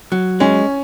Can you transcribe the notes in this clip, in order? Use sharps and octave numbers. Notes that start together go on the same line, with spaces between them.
F#3
G#3 C#4